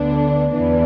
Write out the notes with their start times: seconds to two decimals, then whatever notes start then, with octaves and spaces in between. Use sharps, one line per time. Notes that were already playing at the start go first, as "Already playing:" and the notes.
Already playing: D2 D3 B3 D4
0.52 E2 E3 B3 D4